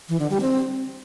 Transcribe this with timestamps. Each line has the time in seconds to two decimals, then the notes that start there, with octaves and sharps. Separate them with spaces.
0.09 E3
0.20 D3
0.30 G3
0.41 C4